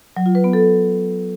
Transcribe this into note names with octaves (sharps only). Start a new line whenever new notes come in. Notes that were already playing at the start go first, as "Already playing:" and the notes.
F#3
F4
B4
B3
A4